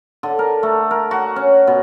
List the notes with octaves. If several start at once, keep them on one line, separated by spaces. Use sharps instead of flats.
D3
A#4
A3
A#4
F#4
C#4
B2